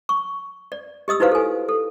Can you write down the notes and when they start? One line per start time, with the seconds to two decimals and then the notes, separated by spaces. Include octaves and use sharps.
0.09 C#6
0.72 D5
1.08 G4 D#5 D#6 E6
1.20 D#4 E4 F#4 B4 C5 F5
1.32 A4 G#5
1.69 A4